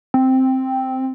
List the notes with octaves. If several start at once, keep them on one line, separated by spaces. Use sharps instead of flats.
C4